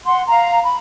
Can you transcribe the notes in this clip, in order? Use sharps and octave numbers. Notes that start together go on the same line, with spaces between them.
F#5 C6
F5 A#5
B5